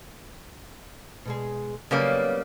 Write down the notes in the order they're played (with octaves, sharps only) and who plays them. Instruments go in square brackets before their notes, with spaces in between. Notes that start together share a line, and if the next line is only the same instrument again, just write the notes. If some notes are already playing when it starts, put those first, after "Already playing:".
[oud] B2 G#3 G#4
[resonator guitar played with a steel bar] C#3 G3 A#3 [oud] F#3 B3 C#5